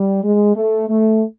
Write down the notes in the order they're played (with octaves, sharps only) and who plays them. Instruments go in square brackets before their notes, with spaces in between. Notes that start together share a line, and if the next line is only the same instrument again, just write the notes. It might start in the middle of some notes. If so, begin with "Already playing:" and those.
Already playing: [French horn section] G3
G#3
A3
A3